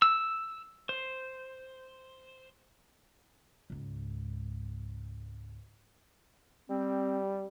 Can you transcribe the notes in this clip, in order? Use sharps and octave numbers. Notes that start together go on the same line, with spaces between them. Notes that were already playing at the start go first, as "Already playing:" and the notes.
E6
C5
C#2 G#2
G3 C4